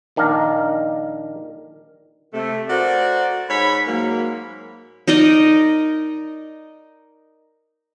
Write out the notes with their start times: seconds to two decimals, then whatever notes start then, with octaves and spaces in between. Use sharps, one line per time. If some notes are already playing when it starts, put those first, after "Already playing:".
0.16 A#1 D#3 D4 F5 A#5
2.34 C3 A3
2.69 F#4 A4 A#4 C5 D5
3.50 G#2 C#5 B5
3.87 G#2 F#3 A#3
5.08 D#4 A#4 D5 D#5